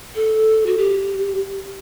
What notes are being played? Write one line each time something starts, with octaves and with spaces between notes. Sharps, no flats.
A4
F#4
G4